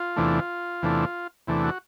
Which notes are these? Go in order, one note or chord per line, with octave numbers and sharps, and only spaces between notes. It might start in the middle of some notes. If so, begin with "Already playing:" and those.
Already playing: F4
E2 C3 E3 A3 D4
E2 C3 E3 A3 D4
E2 C3 E3 A3 D4
F#4